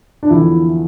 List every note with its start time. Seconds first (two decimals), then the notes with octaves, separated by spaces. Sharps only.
0.23 D4
0.30 E2 D3 F3 E4